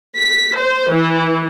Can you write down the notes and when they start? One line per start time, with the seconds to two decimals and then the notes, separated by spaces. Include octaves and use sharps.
0.17 B6
0.56 C5
0.92 E3